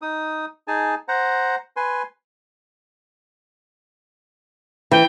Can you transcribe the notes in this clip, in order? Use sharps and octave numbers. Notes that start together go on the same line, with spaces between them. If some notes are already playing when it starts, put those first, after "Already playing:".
D#4 D#6
D#4 G#4 G#5 A5
C5 F#5 A#5
B4 G#5 C6
E3 G5